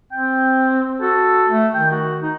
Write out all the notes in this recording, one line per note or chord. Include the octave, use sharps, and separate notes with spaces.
C4 G5
F#4 A4
A3
D#3 G5
F#4
D#4